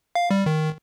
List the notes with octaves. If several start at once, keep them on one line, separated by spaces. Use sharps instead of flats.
F5
G3
D#3